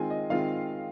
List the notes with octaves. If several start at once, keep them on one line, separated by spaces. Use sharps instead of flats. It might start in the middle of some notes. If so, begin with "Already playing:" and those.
Already playing: D#3 G#3 C4 F4 G#5
D#5
D#3 G#3 C4 F4 F5